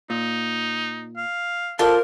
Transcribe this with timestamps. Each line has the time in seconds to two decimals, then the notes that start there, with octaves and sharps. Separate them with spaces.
0.10 A#2 D#4
1.17 F5
1.79 F4 A4 A#4 C5 D5